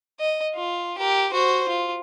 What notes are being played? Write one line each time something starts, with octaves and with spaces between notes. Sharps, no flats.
D#5
F4
G4 A#4
F#4 C5
F4